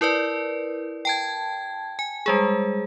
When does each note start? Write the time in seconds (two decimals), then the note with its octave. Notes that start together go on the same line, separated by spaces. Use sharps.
0.01 E4 A#4 B4 D5
1.05 G5 A5 G#6
1.99 G#5
2.26 G3 G#3 G#4